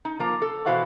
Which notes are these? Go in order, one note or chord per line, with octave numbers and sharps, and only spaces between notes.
D#4
F3 A#3 A#5
A4
B2 E3 F#4 C5 F5 F#5